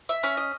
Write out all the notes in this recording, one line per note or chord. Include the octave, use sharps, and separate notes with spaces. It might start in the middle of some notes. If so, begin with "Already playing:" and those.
E5
C#4
D#5